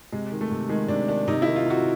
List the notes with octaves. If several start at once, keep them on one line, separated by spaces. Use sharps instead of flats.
C3 G#3
D#3
A3
C3
D#3 G#3
C3 D4
D#3 D4
C3 D#4
D#3 E4
F4
C3 F#4